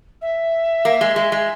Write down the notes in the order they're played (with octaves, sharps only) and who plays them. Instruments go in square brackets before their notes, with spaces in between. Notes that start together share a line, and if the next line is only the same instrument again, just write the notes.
[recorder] E5
[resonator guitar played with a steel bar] A#3
G#3
G#3
G#3